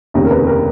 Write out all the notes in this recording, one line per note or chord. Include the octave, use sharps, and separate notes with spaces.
F1 D#2 C#3
A#4
B4
A#4